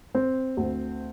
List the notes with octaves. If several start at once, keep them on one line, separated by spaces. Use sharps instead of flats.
C4
D2